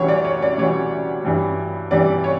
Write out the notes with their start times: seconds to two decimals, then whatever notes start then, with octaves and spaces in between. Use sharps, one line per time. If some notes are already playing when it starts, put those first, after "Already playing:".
Already playing: D2 C#3 E3 G3 C#5
0.08 D5
0.25 C#5
0.42 D5
0.58 D2 C#3 E3 G3 C#5
1.24 G2 E3 G3
1.91 G2 E3 G3 D5
2.24 C#5